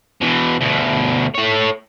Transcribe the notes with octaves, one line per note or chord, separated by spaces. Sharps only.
B2 E3
D2 B2
A3 C#5